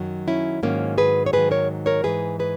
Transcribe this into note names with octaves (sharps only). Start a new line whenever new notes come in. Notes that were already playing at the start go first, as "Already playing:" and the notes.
Already playing: F#2 D#3 F#3
C#4 E4
G#2 D#3 F#3 A#3 C#4
G#4 B4
C#5
G#2 D#3 F#3 G#4 B4
A#4 C#5
A#4 C#5
G#2 E3 G#4 B4
G#4 B4